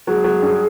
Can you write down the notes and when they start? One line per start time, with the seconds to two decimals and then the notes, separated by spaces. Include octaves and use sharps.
0.07 F#3 G#4
0.24 F#3
0.42 G2